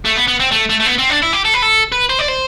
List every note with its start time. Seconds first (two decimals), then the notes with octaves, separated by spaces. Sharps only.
0.05 A3
0.16 B3
0.27 B3
0.40 C4
0.51 A3
0.69 A3
0.80 A3
0.86 B3
0.98 C4
1.10 D4
1.22 E4
1.33 G4
1.45 A4
1.54 B4
1.62 A4
1.92 B4
2.09 C5
2.19 D5
2.28 C5